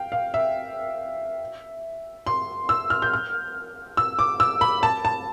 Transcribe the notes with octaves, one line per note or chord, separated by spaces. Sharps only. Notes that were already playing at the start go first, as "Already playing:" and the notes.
Already playing: F5 G5
F5
E5
C6
E6
F6
G6
F6
E6
D6
E6
B5
A5
A5